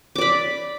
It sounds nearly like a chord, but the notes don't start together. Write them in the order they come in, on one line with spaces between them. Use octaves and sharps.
D6 D5 B5